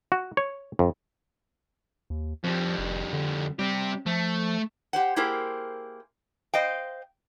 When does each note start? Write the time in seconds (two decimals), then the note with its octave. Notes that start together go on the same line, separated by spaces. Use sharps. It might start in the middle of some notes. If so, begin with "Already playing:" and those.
0.12 F#4
0.37 C#5
0.79 F2
2.10 D#2
2.44 F2 F3 G3
2.78 F1
3.13 D3
3.59 G3 C4 G4
4.06 F3 A3
4.93 G4 C5 F#5
5.16 A#3 E4 G4 G#4 A#4 C5
6.54 C5 D#5 F5 G5